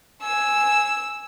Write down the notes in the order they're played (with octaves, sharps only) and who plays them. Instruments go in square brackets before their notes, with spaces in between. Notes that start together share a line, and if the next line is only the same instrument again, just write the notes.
[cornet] G#5 [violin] E6